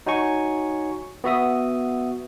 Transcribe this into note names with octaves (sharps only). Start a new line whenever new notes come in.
D#4 F#4 C#5 G#5 C#6
B3 F#4 E5 D#6